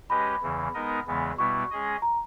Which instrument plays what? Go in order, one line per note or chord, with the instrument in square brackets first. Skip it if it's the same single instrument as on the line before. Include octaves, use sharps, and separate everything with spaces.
[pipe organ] G#3 C#4 G4 B4 D#5 [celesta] B5
[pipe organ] E2 C#3 E3
G#3 B3 D#4 A#4 D#5
E2 C#3 E3 G#3 B3
[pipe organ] B2 G3 B3 E4 [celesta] C#6
[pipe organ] G#3 C#4 G#4 D#5
[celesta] A#5